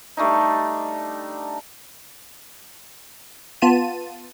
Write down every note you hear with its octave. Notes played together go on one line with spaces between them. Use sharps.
G3 A3 D4 D#4
B3 F4 A5 D#7